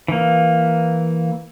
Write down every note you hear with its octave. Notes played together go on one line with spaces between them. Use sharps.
E3 A#3